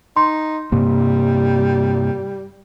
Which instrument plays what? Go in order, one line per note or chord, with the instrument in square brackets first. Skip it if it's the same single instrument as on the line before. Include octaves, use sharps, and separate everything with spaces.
[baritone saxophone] D#4 [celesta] C6
[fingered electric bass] G2 C3 A#3 [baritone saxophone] G3